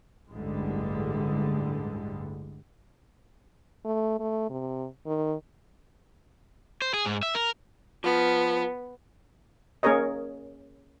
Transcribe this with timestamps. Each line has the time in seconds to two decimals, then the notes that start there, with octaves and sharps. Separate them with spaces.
0.32 A1 D2 G2 D3 G3 G#3
3.85 A3
4.20 A3
4.49 C3
5.06 D#3
6.82 C5
6.94 G#4
7.06 G#2
7.23 E5
7.35 A#4
8.04 F3 B3
9.83 A#3 C#4 G#4 A#4 C#5 D#5